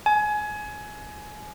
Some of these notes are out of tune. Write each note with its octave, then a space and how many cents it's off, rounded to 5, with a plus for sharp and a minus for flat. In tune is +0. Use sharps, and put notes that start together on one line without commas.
G#5 +20